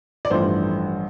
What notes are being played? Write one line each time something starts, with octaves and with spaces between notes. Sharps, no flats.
D5
A1 G2 F3 A3 C5